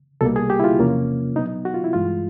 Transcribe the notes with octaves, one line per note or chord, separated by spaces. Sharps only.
C2 B2 G3 A#3 A4
G#4
G4
E4
F4
E2 C3 F3 A#3 C#4
B2 F#3 B3 D#4
F#4
F4
E4
G2 E3 G#3 F4